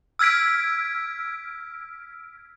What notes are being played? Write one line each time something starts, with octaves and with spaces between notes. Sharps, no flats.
E6 F6 G#6 B6 D7